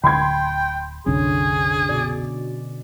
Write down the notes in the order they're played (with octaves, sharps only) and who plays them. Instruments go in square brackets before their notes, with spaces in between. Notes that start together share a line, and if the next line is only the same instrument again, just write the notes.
[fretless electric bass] D1 D3 [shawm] G5 [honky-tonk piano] B5 C6 G#6
[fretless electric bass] F#1 C2 D4 [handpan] D3 C#4 [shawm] G#4
[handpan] B2 D5